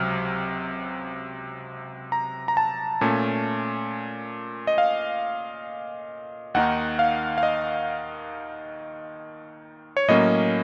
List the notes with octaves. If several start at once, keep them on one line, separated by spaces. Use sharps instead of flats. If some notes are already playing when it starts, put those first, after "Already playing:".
Already playing: C#2 C3 F#3 F6
A#5
A#5
A5
A#2 A3 C#4
D#5
F5
D#2 D#3 A#3 D#4 F#5
F5
F5
D#5
C#5
A2 F#3 A#3 C#4 D#5